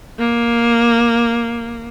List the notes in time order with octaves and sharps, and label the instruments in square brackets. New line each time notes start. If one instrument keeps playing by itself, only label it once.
[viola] A#3